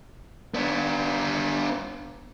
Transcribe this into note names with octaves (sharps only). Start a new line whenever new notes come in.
B3 D4